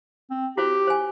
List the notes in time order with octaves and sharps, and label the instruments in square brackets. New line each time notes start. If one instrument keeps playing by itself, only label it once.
[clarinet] C4
[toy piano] E4 F#4 C5 [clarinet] G4
[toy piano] C5 G#5